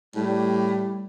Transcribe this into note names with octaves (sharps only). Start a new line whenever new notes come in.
A2 G3